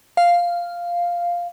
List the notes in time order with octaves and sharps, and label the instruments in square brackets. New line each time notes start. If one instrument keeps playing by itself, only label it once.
[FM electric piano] F5